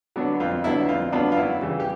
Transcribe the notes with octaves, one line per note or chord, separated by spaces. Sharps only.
D3 F#3 B3 D4
F2 F4
D3 F#3 B3 D4 E4
F2 F4
D3 F#3 B3 D4 F4
F4
F#2 E4
C#3 E3 G3
G4